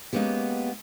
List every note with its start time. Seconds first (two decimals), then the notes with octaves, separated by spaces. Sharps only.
0.13 G#3 A#3 B3 C#4 G4